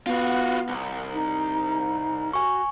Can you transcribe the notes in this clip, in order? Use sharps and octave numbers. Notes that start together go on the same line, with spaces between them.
B3 F4 F#4
C2
D#4
F#4 G#5 C#6